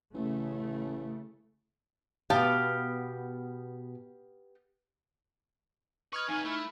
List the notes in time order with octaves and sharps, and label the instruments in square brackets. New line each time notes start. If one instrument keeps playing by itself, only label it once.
[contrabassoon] A1 [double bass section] C#3 A3
[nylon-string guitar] B2 A5 [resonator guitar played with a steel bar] B3 G4 F5
[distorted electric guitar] B4 [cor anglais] D#5 [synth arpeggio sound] C#6 F6 G#6
[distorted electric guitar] F2 B4 [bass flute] D#4 [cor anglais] G#5
[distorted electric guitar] A3 [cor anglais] E4